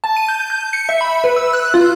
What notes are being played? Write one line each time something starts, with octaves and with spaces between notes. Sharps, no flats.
A5
D#7
G6
G6
C#7
E5
B5
B4
E6
F#6
F4